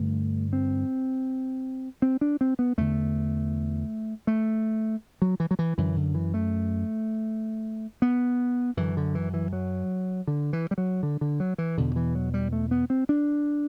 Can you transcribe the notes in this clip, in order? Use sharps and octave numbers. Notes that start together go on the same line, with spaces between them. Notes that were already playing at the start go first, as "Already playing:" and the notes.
Already playing: G2 D3 A3
C4
C4
D4
C4
B3
E2 D3 A3
A3
F#3
E3
F#3
E3
F#2 D3 E3
D3
E3
A3
B3
F#2 D3 E3
D3
E3
E3
F#3
D3
E3
G3
F#3
D3
D3
F#3
E3
E2 B2 D3
E3
F#3
G3
A3
B3
C4
D4